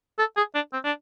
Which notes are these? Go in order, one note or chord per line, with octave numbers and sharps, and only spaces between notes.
A4
G#4
D4
C4
D4